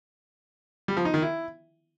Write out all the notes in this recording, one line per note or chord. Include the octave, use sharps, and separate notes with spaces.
G3
F3
D#4
D#3
E4